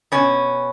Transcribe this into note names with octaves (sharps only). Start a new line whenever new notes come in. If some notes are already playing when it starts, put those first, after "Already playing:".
B2 C#4